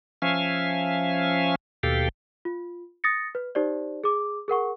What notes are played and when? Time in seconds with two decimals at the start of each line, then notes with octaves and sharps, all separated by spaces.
0.22 F3 C#4 E5 F5 G#5
1.83 D#2 B2 G4 A4 F5 G5
2.45 F4
3.04 D#6 A6 A#6 C#7
3.35 B4
3.55 D#4 G4 C5 D5
4.04 G#4 D6
4.48 G#4 A#4 F#5 C#6